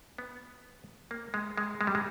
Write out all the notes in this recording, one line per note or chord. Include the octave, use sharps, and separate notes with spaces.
B3
A#3
G#3
G#3
G#3
G3
G#3